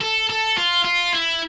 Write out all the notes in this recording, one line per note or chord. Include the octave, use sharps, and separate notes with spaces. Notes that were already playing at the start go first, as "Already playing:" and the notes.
A4
A4
F4
F4
E4